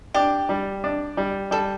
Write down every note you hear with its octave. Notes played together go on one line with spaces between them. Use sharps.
D4 G4
G3
D4
G3
G3 A4